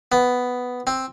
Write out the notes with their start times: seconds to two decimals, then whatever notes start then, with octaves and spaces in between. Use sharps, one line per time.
0.12 B3
0.87 C4